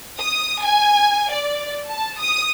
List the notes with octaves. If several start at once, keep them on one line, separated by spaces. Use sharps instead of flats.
D#6
G#5
D5
A5
D#6